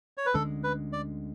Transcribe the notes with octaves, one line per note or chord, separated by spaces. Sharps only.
C#5
B4
D2 D3 G#3 C#4 A4
B4
D5